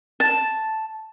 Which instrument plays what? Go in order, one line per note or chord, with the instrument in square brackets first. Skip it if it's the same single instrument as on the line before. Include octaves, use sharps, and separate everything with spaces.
[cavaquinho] A5